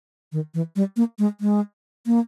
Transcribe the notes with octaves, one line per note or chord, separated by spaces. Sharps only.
D#3
E3
G3
A#3
G#3
G#3
A#3